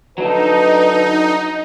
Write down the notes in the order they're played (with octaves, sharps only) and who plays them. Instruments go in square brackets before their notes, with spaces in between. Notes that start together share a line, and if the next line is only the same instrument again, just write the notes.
[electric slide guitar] F#3 D4 A4 [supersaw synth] D#4 [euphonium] B4